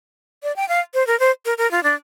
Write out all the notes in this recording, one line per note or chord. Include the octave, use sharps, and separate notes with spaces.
D5
G5
F5
C5
A#4
C5
A#4
A#4
F4
D4